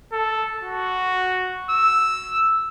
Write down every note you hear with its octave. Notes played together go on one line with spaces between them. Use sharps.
A4
F#4
E6